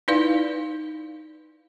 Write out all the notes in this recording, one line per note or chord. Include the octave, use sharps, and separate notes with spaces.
D#4 E4 B4 D5 F5